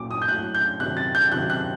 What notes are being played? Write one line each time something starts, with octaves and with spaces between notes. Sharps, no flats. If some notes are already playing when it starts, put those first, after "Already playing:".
Already playing: A#2 F#3 D6
D#6
G6
A2 F#3 F#6
G6
C3 D#3 F#3 F#6
A6
G6
C3 D#3 F#3 F#6
F#6